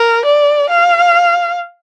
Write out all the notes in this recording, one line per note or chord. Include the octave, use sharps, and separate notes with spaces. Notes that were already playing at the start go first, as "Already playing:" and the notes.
Already playing: A#4
D5
F5